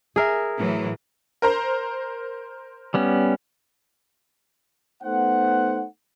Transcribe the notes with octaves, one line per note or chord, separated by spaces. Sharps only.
G#4 A#4 E5
A2 E3 F#3
A#4 C5 A#5
G3 B3 C#4
A3 B3 D#4 C5 F#5